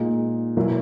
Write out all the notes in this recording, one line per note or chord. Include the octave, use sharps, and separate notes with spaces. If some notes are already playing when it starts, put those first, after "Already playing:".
Already playing: A#2 G#3 D#4
E2 B2 F#3 A#3 E4